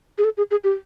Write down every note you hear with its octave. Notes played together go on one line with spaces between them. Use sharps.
G#4
A4
G#4
G#4
G4